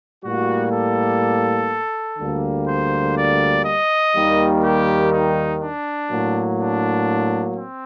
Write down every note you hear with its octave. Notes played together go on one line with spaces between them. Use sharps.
A2 G3 A#3 F#4
A4
D2 D3 G3 A#3
C5
D5
D#5
D#2 D#3 G3 A#3
G4
D#4
D4
A2 F#3 A#3
D4
C4